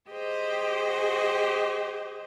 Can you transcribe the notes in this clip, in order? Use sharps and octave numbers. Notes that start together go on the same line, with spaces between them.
G4 G#4 C5 D#5